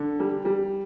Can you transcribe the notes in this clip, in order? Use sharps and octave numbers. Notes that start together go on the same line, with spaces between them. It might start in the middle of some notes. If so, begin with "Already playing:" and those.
Already playing: D3
G3
G3